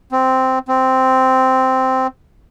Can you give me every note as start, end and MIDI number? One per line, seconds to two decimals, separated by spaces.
0.12 0.59 60
0.68 2.07 60